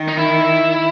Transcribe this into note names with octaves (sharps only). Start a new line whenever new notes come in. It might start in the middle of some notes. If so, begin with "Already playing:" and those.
Already playing: D#3
D#4
E4